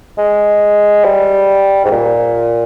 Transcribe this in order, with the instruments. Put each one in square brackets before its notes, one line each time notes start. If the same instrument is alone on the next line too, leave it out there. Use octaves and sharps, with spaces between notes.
[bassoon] G#3
G3
G#2
A#2